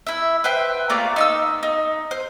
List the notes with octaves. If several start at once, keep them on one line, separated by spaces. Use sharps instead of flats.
E4 E5
B4 C5 E5 G5
A3 A#3 F4 D5
D#4 B5 E6
D#4
C5